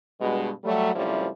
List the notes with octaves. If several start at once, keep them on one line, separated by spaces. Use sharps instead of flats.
G2 B2 G#3
F#3 G3 A3
F#2 A2 C3 F3 G3 E4